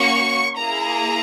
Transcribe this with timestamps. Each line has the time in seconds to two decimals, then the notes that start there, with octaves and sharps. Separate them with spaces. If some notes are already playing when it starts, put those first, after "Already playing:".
Already playing: A#3 C#4 F#4 C#6
0.58 A#3 E4 G#4 A#5